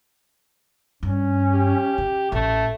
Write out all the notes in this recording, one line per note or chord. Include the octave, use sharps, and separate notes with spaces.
G2 C#4
G4
C#3
A1 A3